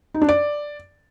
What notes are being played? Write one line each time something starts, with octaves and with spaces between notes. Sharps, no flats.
D#4
D4
D5